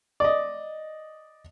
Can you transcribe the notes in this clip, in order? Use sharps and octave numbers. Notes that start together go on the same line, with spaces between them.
D5 D#5